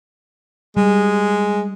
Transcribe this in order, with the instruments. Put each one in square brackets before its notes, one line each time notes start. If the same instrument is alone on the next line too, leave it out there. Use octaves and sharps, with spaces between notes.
[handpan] G3 [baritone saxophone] G#3